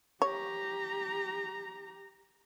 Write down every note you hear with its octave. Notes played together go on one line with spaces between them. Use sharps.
G4 C#5 A#5